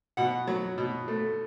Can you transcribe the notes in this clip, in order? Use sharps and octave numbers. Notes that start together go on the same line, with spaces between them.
B2 F#5
F#3
B2
A3